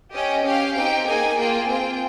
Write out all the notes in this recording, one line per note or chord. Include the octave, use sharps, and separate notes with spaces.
C#4 G4 D#5
C#4 G4 F5
C4 D#4 G4 G5
A#3 D#4 G#4 G#5
A#3 F4 G#4 G5
C4 F4 G#4 G5